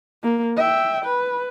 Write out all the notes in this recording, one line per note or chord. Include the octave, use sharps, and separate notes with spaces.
A#3
E5 G5
B4